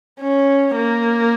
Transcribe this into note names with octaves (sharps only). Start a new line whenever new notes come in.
C#4
A#3